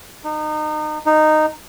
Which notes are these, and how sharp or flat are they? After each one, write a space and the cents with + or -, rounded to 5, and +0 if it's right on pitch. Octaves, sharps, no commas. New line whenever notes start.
D#4 -30
D#4 -10